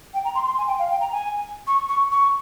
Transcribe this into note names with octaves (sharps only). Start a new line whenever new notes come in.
G5
A#5
C6
C6
G#5
G5
F5
G5
A#5
G#5
C#6
C#6
C#6